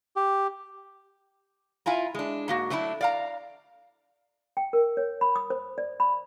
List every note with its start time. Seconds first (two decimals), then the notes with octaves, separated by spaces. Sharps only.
0.16 G4
1.86 E4 F4 G#5 A#5
2.15 G#3 D4
2.48 G#2 A#3 F#4
2.70 F#3 A3 C#4 D4 E4
3.01 D5 F5 A#5
4.57 G5
4.73 A#4
4.97 C#5
5.21 B5
5.36 D#6
5.50 C5
5.78 D5
6.00 B5